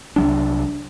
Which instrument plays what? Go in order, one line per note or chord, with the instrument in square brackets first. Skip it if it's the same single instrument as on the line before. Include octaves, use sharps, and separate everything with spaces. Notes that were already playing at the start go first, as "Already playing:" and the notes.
[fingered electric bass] C2 F#3 D4